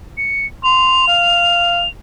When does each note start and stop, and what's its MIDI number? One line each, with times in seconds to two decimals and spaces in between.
0.17 0.46 97
0.64 1.05 84
0.64 1.88 101
1.08 1.84 77